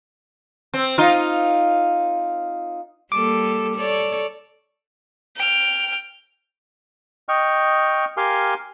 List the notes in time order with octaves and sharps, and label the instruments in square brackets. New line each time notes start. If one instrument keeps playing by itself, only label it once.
[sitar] C4
D#4 F4
[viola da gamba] G3 A#3 A4 [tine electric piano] D6
[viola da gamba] A4 C#5 D5
[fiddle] G5 F6
[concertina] D#5 G5 C#6 F6
G4 A#4 F5 G#5 C6